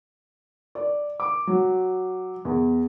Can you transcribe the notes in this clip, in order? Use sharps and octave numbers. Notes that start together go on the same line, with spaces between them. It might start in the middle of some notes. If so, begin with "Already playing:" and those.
D5
D6
F#3
E2